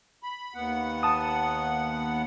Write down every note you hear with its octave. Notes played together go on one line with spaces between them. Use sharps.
B5
D#2 B3 F#5
A5 D#6